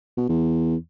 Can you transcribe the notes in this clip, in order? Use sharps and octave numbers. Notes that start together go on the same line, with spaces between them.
B2
E2